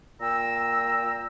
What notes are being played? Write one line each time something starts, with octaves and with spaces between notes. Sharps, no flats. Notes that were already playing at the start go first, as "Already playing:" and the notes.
A#2 G5 A#5 E6